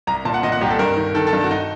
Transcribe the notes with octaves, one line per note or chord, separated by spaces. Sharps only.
C2 A#5
A#2 A5
F#5
A#2 D#5
F#5
C2 G4
A4
G2 A#4
D#3
D#3 A4
A4
G2
F#4
D#4